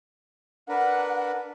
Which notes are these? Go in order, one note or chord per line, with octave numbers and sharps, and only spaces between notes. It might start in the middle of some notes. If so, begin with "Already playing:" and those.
D4 A#4 B4 F#5